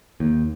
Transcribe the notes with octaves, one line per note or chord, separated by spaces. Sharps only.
D#2